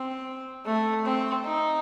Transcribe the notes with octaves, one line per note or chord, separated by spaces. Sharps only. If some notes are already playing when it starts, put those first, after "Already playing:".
Already playing: C4
A3
C4
D#4